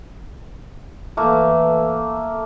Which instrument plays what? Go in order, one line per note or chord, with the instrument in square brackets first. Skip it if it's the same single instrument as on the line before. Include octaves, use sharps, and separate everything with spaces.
[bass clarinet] E3 [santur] A3 A#3